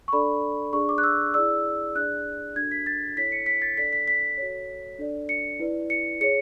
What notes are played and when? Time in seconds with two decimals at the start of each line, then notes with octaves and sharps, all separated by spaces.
0.08 C#6
0.13 D4 A4 D5 B5
0.73 D4 G#4 D5 C#6
0.89 D6
0.98 F#6
1.03 E6
1.34 E4 G#4 D5 E6
1.95 D4 G#4 D5 F#6
2.56 D4 F#4 A4 G#6
2.71 B6
2.86 A6
3.16 E4 A4 C#5 B6
3.32 C#7
3.46 B6
3.62 A6
3.77 D4 A4 D5 B6
3.93 B6
4.08 B6
4.38 F#4 A4 C#5
4.99 D4 A4 D5
5.29 C#7
5.60 E4 B4 D5
5.90 C#7
6.21 G#4 C#5 C#7